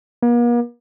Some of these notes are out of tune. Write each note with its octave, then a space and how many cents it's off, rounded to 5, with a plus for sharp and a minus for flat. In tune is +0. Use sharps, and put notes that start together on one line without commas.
A#3 +45